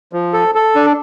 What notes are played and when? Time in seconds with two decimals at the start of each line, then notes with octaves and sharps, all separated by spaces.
0.13 F3
0.33 A4
0.55 A4
0.75 D4